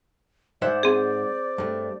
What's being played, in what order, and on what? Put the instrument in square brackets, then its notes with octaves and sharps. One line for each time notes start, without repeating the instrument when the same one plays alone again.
[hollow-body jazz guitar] G#2 E5 F#5 [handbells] C5 [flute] D5
[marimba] C4 G#4
[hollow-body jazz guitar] G2 A3